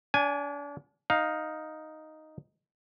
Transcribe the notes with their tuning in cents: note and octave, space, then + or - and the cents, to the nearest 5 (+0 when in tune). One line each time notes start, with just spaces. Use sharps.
D4 -35 G#5 +0
D#4 +0 F5 +10